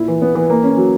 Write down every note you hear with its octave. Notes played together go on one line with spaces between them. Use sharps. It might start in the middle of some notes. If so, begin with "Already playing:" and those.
Already playing: A#2 E4
E3
B3
E3
A#3
C#4
F#3